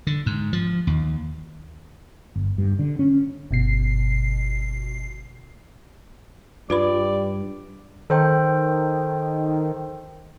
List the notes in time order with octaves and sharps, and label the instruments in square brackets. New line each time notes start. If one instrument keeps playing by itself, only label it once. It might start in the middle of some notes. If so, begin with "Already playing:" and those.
[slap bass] D3
G#2
F3
D#2
[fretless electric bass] G1
G2
D3
C#4
[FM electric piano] G1 B2 C7
[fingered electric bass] G2 [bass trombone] G3 [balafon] F4 B4 B5 [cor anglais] D5
[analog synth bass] D#3 [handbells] A4 C5 G5